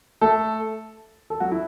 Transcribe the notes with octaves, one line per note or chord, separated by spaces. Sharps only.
A3 A4
A4
F#3 F#4
E4